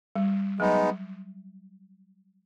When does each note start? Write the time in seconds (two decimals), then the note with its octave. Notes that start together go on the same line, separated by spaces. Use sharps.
0.15 G3
0.59 F#3 G#3 B3 D#4